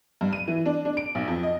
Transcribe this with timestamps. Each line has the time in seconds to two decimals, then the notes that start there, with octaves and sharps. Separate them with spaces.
0.21 G2
0.33 D#7
0.48 E3
0.66 D4
0.85 D4
0.97 D7
1.15 B1
1.28 F2
1.43 D#5